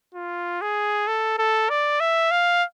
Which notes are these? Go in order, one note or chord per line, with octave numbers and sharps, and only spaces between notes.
F4
G#4
A4
A4
D5
E5
F5